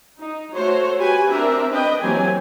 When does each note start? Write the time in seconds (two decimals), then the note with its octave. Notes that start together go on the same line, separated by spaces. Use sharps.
0.20 D#4
0.54 A3 F#4 C5 C#5
0.99 F#4 G4 B4 G#5
1.30 C4 D4 A#4 E5
1.70 D4 B4 D#5 G5
2.01 E3 F#3 A#3 C4 G4 G#5